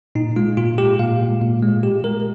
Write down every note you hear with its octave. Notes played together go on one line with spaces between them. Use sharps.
A#2 D#4
G#3 F4
A#2 F4
G#3 G4
A#2 F5
A#2
A#2
G#3
G#3 G4
G#3 A#4